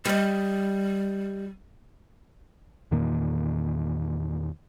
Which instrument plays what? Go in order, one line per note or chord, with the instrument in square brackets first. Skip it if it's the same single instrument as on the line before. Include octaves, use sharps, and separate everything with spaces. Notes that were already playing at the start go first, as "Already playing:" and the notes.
[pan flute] G3 [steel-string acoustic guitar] G4 D#5
[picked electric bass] E2 A#2 D#3 A#3